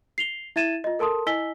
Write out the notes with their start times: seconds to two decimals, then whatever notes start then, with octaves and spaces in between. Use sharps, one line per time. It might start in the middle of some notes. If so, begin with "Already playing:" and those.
0.18 C7 F7 G7
0.56 E4 E5 G#6 A6 D#7 E7
0.84 F4 D#5
0.99 A4 A#4 A5 C6 D#6
1.26 E4 D#5 G#5 E6 B6 G7